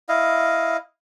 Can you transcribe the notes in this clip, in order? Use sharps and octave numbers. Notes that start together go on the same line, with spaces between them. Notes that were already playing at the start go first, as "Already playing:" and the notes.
E4 D#5 F5